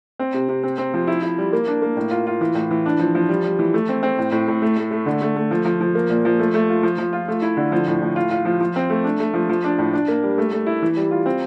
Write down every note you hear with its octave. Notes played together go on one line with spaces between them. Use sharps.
C4
C3
C3
C4
C4
F3
E4
E4
G3
A#3
D4
A#3
A2
F4
F4
E3
A2
E3
D4
F3
F3
G3
G3
E3
A3
C4
C4
A2
A2
A2
A3
A3
A3
D3
A3
A3
F3
F3
F3
A#3
A#2
F3
A3
A3
F4
F3
F3
F4
A3
E4
D3
F3
A2
A2
F4
F4
F3
F3
C4
A3
D4
A3
F3
F3
D4
A2
D4
A#3
G3
A3
A3
E4
E3
G3
F4
C4